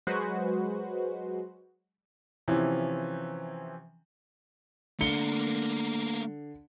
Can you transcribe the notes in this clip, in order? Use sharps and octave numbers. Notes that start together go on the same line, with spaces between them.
F#3 G#3 F#4 B4 C5
C3 E3 F3 C4 C#4
D3 A3 A#3 C#7 G7